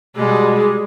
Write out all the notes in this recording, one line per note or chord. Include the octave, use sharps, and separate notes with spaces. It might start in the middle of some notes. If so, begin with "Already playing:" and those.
B2 G3 G#3 G#4